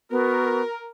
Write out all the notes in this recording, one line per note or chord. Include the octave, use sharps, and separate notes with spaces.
B3 F#4 A#4